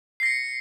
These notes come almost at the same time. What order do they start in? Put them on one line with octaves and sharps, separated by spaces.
C7 A#6 C#7